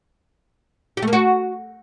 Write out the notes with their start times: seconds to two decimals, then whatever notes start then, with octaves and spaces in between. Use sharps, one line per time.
0.97 G4
1.02 A3
1.08 A#3
1.13 F#4